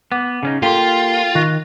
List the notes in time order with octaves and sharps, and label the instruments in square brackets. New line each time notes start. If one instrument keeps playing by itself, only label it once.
[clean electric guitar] B3 [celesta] F#5 D6
[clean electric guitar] C#3 C#4 D#4
[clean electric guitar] A#3 G4 C6 [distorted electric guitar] F4 [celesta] A4 G5
[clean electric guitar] D#3 [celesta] C#6 F#6 A#6